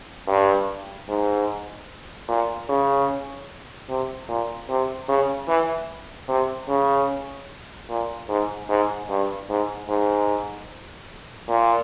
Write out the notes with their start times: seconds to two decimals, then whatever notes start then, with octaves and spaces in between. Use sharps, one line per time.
0.28 G2
1.09 G#2
2.28 A#2
2.69 C#3
3.89 C3
4.28 A#2
4.69 C3
5.08 C#3
5.48 E3
6.28 C3
6.68 C#3
7.89 A#2
8.28 G#2
8.69 G#2
9.09 G2
9.49 G#2
9.89 G#2
11.49 A#2